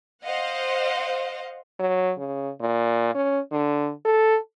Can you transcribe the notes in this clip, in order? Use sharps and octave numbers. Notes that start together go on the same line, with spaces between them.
C5 D#5 F5 F#5
F#3
C#3
A#2
C#4
D3
A4